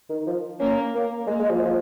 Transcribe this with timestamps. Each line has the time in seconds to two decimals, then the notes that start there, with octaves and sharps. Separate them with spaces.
0.09 D#3
0.27 F3
0.60 A#3 C#4
0.94 A#3
1.27 G#3 A#3
1.39 G#3
1.50 F3
1.65 F3